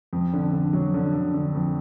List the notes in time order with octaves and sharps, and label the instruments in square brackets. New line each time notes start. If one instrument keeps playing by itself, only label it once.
[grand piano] F2
D3
D3
F#3
D3
D3
D3
F2